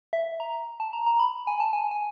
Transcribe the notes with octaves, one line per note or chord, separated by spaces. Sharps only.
E5
A#5
A5
A#5
A#5
B5
G#5
A5
G#5
G#5